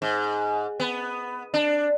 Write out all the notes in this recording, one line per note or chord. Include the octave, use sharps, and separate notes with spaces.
G#2
B3
D4